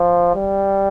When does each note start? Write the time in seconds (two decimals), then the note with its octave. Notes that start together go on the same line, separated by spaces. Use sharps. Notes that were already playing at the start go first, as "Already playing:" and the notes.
Already playing: F3
0.35 G3